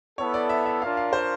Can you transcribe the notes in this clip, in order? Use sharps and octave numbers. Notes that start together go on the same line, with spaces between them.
B3 E4 A4 C#5
D5
E5
E5
D4 F4 A#4 F5
F5
C5